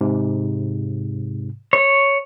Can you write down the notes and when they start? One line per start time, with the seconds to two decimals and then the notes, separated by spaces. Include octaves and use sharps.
0.01 G#2 C3
1.73 C#5